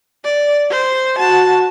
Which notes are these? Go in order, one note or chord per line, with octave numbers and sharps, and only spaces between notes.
D5
C5
F#4 A5